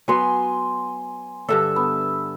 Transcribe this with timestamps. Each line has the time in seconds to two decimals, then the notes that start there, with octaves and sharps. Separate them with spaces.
0.08 F#3 B3 G#5 C6
1.49 G2 D3 A4 E5
1.76 B3